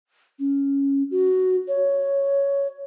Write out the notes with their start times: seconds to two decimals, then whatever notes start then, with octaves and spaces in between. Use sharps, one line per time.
0.39 C#4
1.11 F#4
1.68 C#5